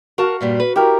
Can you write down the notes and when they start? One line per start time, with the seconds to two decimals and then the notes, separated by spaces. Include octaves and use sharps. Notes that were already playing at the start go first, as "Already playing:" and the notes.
0.18 F#4 A#4 F5 A5
0.41 G2 A#2 G3
0.60 B4
0.76 E4 G4 A#4